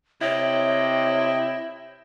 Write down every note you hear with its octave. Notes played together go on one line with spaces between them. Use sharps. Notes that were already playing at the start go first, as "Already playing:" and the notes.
C3 E4 C#5 D#5 G5